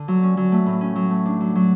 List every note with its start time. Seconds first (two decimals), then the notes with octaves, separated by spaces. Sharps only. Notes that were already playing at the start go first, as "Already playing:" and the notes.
Already playing: D3
0.08 F#3
0.23 C#4
0.37 F#3
0.52 A3
0.66 A2
0.81 C#4
0.96 F#3
1.10 A3
1.26 D4
1.40 F#3
1.55 F#3